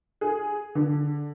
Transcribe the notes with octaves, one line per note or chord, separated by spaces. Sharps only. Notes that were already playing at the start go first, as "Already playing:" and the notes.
G#4
D3